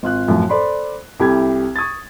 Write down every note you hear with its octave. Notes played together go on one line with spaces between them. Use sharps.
G#1 F4 F#6
F#2 A2 F3
A4 C5 D5 B5 C6
C2 E4 G4 A4 G#6
C#6 D#6 G#6 A6